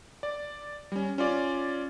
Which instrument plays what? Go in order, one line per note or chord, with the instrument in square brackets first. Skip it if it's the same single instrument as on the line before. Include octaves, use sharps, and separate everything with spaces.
[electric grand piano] D5
G3 C#4
C#4 F4 D5